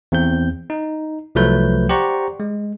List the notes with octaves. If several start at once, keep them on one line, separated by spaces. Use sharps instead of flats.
E2 C4 G6
D#4
C2 F3 F#3 A3 B4 G6
G4 C5 D5 F#5 A#5 C#6
G#3